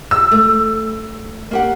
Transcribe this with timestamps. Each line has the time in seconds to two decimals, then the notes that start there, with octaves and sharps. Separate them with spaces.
0.11 E6
0.32 A3
1.51 A#3 G4 F#5